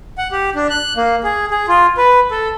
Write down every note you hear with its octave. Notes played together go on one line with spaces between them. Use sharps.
F#5
G4
D4
F#6
A#3
G#4
G#4
F4
B4
A4